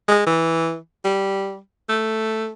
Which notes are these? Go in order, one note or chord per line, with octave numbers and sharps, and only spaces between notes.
G#3
E3
G3
A3